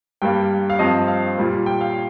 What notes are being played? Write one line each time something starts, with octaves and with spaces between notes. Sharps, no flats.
G2 G3 A#3 G5
F5
G2 F3 C4 D#5
F5
A#2 G3 A#3
G5
F5